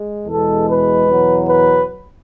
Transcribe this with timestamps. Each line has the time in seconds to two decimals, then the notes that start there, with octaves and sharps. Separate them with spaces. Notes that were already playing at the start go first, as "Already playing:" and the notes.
Already playing: G#3
0.27 E2 B2 G#3 A4
0.67 B4
1.07 E2 B2 F#3
1.46 B4